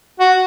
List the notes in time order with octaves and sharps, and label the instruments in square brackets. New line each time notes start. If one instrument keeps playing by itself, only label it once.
[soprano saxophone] F#4